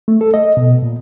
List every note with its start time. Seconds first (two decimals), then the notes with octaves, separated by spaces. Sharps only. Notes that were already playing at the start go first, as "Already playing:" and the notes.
0.08 A3
0.21 A4
0.34 D#5
0.57 B2
0.83 A#2